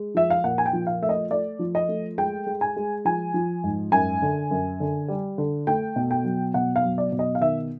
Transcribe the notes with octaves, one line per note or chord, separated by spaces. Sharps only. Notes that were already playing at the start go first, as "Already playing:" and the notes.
Already playing: G#3
F3 E5
F5
A#2 F#5
G#5
G5
F3
F5
A3 E5
D#5
A3 D5
F3
D#5
A3
G#3 G5
G#3
G#5
G#3
F3 G#5
F3
G#2
F#2 G#5
D3
F#2
D3
G3
D3
A3 G5
B2
G5
F#3
B2 F#5
F5
F#3
D5
B2
D#5
F5
D#3 E5